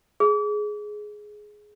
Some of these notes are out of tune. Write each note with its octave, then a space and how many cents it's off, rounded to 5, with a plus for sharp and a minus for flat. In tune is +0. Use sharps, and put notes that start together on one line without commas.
G#4 +10